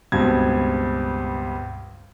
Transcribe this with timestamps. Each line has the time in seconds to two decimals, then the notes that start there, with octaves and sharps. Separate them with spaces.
0.12 C#2 G2 B2 C4 G#6